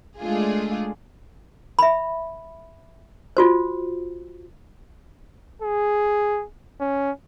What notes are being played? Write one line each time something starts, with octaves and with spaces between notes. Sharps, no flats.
G#3 A3 D4 F4 G#4
E5 B5
F4 F#4 C5
G#4
C#4